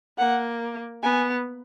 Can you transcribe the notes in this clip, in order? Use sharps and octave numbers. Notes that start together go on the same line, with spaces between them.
A#3 F#5
B3 G#5